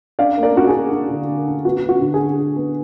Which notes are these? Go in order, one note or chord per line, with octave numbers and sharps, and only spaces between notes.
D4 D5 F5
A#3
A#4 D5
D4 F#4
G#4
D4
D4
D3
D3
D4
B3 F#4
B3
F#4
D3
G#4
D3
D3
B3